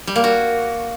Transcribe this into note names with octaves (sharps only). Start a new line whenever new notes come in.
G3
A#3
F#4